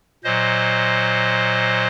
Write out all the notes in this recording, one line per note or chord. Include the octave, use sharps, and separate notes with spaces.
A#2 F#3 C5 D#5